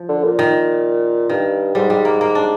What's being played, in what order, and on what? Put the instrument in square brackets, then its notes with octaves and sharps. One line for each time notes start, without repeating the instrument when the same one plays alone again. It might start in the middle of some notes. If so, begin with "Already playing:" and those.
Already playing: [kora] F3
[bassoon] D3
A#2
[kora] D#3
[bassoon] G2 [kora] D#3
[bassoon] G#2 [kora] G3
[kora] G3
A#3
A#3
D4